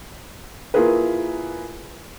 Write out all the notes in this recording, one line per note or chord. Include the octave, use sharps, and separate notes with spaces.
A#3 E4 F4 G#4 A#4 B4